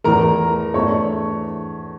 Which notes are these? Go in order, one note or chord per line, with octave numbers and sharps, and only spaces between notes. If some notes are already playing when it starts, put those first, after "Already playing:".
E2 E3 A3 A#4 A#5
E2 E3 A3 D4 C#5 C#6